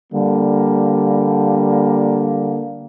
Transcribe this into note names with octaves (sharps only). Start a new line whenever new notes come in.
D3 G3 A#3